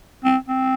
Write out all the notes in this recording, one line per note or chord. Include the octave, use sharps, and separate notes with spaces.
C4
C4